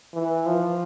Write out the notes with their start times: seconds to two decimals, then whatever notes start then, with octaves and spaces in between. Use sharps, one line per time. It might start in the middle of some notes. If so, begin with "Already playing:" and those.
0.14 E3
0.46 F3